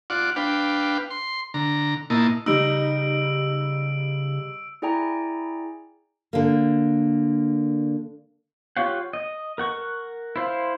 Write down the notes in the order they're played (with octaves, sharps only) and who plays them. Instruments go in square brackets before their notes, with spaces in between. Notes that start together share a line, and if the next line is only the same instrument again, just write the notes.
[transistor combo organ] F4 D5 F#5
D4 B4 F5 G5
C6
D3 A#5
A#2 A#3 E4 D#5 A5
[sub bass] C#3 [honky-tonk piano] G3 D#4 [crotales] E6 D7
[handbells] E4 G#4 D5 G5 G#5 A#5
[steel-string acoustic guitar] D3 A#3
[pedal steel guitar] F4 G4 C#5 F5 F#5
D#5
A#4 F#5 C#6
E4 C5 F5